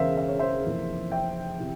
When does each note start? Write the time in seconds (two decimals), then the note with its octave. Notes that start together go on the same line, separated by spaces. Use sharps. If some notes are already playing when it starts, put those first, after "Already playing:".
Already playing: E1 E2 C#3 A#4 C5 E5 F5
0.17 E5
0.28 C#5
0.39 C5 E5
0.64 F1 F2 E3 A#3
1.12 E5 G5
1.59 C3 E3